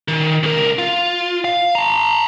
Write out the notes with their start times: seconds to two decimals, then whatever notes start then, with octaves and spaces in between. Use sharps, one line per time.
0.08 D#3
0.43 C#2 A#4
0.79 F4
1.44 F5
1.75 A5 A#5